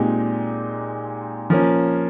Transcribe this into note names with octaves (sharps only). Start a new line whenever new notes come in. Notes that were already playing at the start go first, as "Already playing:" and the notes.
Already playing: A#2 G#3 C4 D#4 G4
F3 A#3 C#4